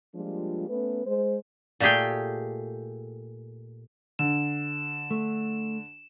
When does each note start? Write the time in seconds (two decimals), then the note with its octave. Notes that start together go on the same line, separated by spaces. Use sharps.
0.14 F3 G3 G#3 A#3 D4 F4
0.69 A3 B3 C#4 B4
1.06 G#3 C5
1.80 A#2 A3 G4 G#4 G5
4.19 D3 E7
5.11 A3